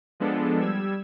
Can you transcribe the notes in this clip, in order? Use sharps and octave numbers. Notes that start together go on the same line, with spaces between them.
F3 G#3 B3 D4 A4
G3 E6 G#6